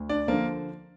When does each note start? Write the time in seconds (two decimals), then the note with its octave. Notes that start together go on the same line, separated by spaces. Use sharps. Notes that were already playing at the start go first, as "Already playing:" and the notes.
Already playing: D2
0.09 D4 D5
0.28 D3 F3 A#3 A#4